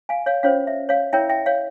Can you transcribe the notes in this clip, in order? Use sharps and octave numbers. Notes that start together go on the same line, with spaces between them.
F5 G#5
C#5 F5
C#4 F4 C5 C#5 F5
E5
C#5 F5
E4 A#4 C#5 E5 G5
E5 G5
C#5 F5